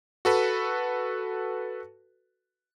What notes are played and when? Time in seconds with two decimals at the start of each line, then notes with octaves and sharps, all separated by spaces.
0.25 F#4 A4 B4